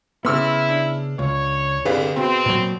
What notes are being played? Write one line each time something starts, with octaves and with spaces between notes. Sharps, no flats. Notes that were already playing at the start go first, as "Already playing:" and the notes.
C#3 B3 E4 C6 E6 F6
D4
C#2 C#5
G1 C2 D3 G#4 B4 F5
B2 C4
A#2 F#3